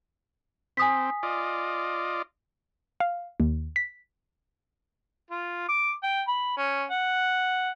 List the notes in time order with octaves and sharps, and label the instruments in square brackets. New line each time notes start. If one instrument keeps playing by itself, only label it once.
[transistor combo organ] C4 [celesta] G#5 D#6 B6
[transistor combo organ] F4 D5 D#5
[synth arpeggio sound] F5
D#2
B6
[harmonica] F4
D6
G5
B5
C#4
F#5